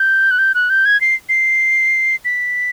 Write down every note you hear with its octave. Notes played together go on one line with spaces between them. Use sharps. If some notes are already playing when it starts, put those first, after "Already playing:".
Already playing: G6
F#6
G6
F#6
G6
G#6
C7
C7
B6